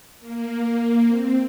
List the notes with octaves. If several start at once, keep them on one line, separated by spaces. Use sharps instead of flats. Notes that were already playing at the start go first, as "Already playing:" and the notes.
A#3
C4